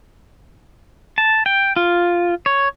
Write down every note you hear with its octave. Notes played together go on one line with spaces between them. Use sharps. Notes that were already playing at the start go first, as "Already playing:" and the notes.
A5
G5
F4
C#5